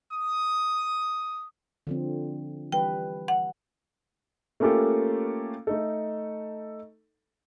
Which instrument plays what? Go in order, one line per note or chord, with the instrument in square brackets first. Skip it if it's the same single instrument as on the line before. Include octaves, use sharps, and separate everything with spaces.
[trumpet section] D#6
[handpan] D3 F3 C4
[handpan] E3 G3 B4 [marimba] G5
[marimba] F#5
[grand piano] A3 A#3 C#4 F4 G4 A4
A3 D#4 A4